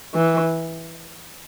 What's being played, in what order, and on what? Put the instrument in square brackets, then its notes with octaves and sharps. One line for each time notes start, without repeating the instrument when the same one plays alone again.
[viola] E3